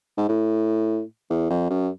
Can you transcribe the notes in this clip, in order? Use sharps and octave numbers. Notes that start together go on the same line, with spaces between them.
G#2
A2
E2
F2
F#2